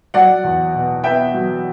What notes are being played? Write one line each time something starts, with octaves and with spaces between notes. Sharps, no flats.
F#3 D5 F#5
E2
B2
B3 E5 G5
F#3